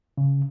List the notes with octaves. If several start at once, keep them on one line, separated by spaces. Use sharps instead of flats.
C#3